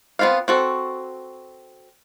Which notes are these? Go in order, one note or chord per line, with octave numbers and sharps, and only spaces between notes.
B3 C4 F4 C5 F5
C4 F#4 A4